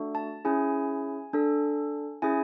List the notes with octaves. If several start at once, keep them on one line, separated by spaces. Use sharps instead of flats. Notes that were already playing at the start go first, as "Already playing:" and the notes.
Already playing: A3 D4 F#4 A4
A5
C#4 E4 G#4 G#5
D4 A4
C#4 E4 G#4 G#5